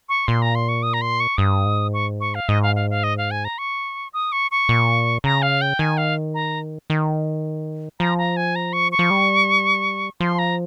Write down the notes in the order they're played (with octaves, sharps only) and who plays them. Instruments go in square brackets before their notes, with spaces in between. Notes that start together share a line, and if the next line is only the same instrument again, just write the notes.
[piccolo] C#6
[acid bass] A#2 [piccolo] C6
[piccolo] A#5
C6
C#6
D#6
A#5
C6
C#6
[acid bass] G2 [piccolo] D#6
[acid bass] G#2
[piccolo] C#6
C#6
F5
[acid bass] G#2 [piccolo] D#5
[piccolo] F5
F5
F5
D#5
F5
G#5
A#5
C#6
D#6
C#6
C#6
[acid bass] A#2
[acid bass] C#3 [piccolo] A#5
[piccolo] F5
G5
[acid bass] D#3 [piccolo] G#5
[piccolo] F5
A#5
[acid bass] D#3
[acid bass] F3 [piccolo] A#5
[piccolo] A#5
G#5
A#5
C#6
C#6
[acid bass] F3
G3
[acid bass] F3 [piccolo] C6
[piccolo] A#5